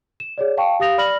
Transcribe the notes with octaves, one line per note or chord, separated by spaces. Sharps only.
E7
G#4 C#5 D5
F5 G5 A5 C#6
G4 F5 D#6 A#6 F7
D5 B5 F6 A#6 F#7